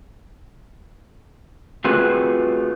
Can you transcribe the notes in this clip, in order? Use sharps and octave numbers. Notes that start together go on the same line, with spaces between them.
A3 C4 F4 F#4 G#4 B4